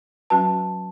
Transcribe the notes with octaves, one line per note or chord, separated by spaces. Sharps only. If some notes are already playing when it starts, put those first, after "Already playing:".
F#3 C#4 F#4 B4 A5